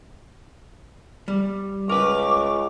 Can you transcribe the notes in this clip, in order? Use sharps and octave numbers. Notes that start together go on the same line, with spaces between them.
G3
C#2 A#4 B4 C#6 D6